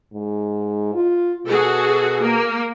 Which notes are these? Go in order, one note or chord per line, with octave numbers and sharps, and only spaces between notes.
G#2
F4
B2 F#4 G#4 A4
A#3